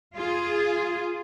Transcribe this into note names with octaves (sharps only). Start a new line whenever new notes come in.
F4 G#4